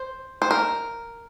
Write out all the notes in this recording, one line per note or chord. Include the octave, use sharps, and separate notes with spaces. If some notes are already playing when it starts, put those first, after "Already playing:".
Already playing: C5
C5
A#4